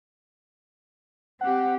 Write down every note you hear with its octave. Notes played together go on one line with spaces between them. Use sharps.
C4 G4 F#5